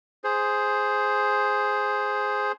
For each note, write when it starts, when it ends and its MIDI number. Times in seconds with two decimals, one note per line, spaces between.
0.24 2.52 68
0.24 2.52 72